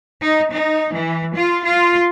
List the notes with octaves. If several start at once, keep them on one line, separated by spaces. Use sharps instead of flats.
D#4
D#4
E3
F4
F4